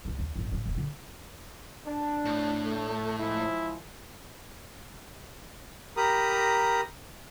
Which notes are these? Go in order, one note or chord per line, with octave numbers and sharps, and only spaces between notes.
C#2 G#3
D#2
G#1 G2
A1 D#4
D#1 B3
D3
D4
A2
A3
F3 G#3 E4
G4 A#4 A#5 B5 D#6